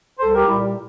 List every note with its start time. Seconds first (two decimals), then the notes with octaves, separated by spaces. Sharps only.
0.19 C2 A4 C5
0.34 G4 A#4
0.46 A#2 G3 E4 G4